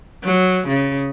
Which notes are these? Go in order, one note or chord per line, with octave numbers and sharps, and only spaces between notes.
F#3
C#3